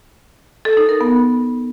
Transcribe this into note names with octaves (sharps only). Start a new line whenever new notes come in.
A4
D#4
A#4
B3